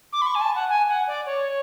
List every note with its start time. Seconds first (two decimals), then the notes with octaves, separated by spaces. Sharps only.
0.13 D6
0.22 B5
0.27 C#6
0.35 G#5
0.41 A5
0.55 F#5
0.69 G#5
0.88 F#5
1.08 D5
1.26 C#5